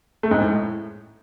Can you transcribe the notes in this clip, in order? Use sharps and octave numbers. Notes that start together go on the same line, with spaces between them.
A3
G#2 G#3
A2